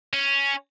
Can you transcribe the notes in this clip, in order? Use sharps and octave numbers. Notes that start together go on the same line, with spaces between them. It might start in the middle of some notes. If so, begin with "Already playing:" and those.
C#4